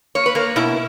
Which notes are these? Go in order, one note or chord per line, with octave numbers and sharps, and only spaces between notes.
A#3 C#5
B4
A#3 A#4
B2 E4